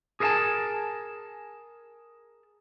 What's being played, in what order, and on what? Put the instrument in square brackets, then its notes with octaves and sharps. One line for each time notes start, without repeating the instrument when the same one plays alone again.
[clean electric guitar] G#4 A#4 C5 E5 G#5 A5